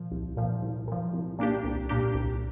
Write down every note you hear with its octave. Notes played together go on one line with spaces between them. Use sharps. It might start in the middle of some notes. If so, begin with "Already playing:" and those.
Already playing: A#2 F3
C2
A#2 F3
C2
A#2 F3
C2
A#2 A#3 D4 G4
C2
A#2 A#3 D4 G4
C2